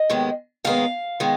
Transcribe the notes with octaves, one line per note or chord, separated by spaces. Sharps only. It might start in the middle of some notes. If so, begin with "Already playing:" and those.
Already playing: D#5
D#2 D#3 G#3 B3
D#2 D#3 G#3 B3 F5
D#3 G#3 B3